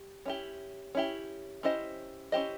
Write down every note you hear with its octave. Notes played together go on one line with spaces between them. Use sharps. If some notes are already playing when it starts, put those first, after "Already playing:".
Already playing: G4
C#4 E4 G4
C#4 E4 G4
C#4 E4 G4 C5 D#5
C#4 E4 G4 C5 D#5